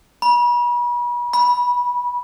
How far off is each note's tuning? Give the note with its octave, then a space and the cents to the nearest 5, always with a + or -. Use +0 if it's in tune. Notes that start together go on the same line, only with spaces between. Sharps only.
B5 -40
B5 -20